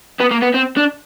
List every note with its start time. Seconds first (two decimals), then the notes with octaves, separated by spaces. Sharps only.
0.20 B3
0.31 A#3
0.42 B3
0.54 C4
0.77 D4